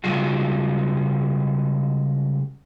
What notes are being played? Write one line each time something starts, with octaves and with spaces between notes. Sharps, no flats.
C#3 G3 G#3 F4 F#4